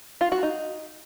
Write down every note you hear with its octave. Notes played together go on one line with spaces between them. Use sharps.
F4
F#4
D#4